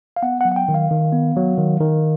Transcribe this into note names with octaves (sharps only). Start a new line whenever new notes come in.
F5
B3 F#5
F#5
F#3
F#5
G5
D#3
F5
D#3
B3
F#3
D#3
D#3